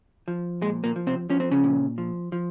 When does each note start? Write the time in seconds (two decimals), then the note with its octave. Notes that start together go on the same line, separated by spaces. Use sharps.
0.28 F3
0.62 A#2 G#3
0.84 A#2 A#3
0.96 F3
1.07 C3 C4
1.30 F3 C#4
1.40 C4
1.51 C#3 C#4
1.64 A#2
1.98 F3
2.32 F3